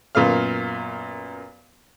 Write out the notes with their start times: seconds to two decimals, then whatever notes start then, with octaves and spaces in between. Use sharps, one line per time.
0.15 F#2 A#2 B3 F5 F6